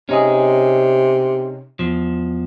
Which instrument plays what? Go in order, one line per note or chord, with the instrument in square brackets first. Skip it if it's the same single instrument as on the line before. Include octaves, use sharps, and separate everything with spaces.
[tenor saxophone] C3 [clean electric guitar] C#4 D#4 G#4
[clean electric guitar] E2 F3